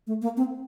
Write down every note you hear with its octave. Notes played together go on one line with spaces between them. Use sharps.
A3
A#3
C4